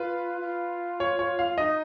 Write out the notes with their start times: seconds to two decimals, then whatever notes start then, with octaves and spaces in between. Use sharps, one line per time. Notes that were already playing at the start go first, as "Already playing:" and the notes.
Already playing: F4 B4
0.41 F4
1.00 C#5
1.19 C#5
1.39 F5
1.58 D#4 D#5